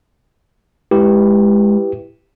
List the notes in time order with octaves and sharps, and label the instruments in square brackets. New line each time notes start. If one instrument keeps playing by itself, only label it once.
[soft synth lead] G#3 [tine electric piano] E4 G4 B4